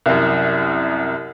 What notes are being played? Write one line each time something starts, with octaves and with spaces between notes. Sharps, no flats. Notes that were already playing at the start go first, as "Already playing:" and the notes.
C2 F#2